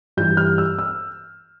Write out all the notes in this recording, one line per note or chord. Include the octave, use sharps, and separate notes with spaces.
G2 E3 G3 G6
F6
E6
E6